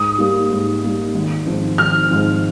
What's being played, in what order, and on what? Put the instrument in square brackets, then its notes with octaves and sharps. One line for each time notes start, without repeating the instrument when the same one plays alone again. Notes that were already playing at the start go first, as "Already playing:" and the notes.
Already playing: [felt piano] G#2 [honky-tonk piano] D#6
[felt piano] G3 A#3
G#2
G3 A#3
G#1
G#2 F3 C4
[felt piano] G#1 [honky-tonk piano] F6
[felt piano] G#2 F3 C4